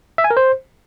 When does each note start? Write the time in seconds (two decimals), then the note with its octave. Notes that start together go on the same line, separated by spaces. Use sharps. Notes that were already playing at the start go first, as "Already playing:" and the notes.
0.18 E5
0.24 G#5
0.30 A#4
0.37 C5